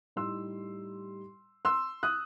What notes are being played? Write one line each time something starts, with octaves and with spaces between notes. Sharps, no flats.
A2 G3 D#4 C6 E6
C6 E6
D#6 F#6